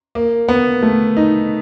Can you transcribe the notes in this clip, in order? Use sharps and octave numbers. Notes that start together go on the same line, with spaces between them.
A#3
B3
A3
D#4